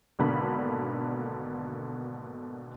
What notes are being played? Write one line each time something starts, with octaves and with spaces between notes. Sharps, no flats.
G#1 B2 D3 A#3 B5